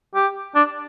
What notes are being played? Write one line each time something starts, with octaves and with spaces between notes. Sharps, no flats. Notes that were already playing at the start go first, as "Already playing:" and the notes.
G4
D4